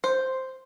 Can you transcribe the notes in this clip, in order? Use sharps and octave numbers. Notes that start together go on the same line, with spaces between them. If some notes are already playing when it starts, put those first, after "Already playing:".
C5